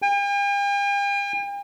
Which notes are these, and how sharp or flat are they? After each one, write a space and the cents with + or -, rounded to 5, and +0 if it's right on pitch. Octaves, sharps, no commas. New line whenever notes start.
G5 +45